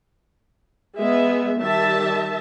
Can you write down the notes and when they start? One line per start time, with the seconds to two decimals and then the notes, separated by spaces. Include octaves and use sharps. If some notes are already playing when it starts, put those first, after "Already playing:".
0.98 G#3 B3 E5
1.59 D#3 G3 E5 A5